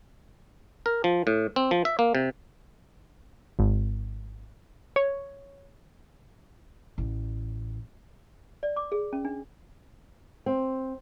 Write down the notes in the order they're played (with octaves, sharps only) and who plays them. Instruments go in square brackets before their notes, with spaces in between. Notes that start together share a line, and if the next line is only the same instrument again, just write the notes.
[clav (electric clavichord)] A#4
F3
A2
C4
F3
E5
A#3
C3
[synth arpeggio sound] G#1
C#5
[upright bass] A1
[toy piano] D5
D6
G#4
C#4
D4
[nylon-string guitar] C4